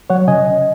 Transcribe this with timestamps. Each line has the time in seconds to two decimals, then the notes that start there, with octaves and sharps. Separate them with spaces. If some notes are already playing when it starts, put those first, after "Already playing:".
0.10 F#3 C#5 F#5
0.28 C#3 D#5 G#5